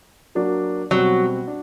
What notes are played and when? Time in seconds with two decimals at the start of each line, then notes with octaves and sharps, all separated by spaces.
0.35 F#3 A#3 D4 F#4
0.91 B2 F#3 G3 C4
1.48 D4